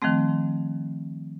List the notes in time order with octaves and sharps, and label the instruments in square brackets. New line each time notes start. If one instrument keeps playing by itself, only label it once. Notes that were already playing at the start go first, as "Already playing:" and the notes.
[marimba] D#3 F3 G3 A3 C4